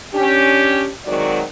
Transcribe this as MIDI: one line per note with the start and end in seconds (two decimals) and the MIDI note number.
0.14 0.88 61
0.14 0.88 62
0.14 0.88 67
1.06 1.43 51
1.06 1.43 54
1.06 1.43 56
1.06 1.43 60
1.06 1.43 66
1.06 1.43 74